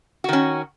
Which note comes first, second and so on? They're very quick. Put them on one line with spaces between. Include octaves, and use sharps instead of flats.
F#4 D#3 C#4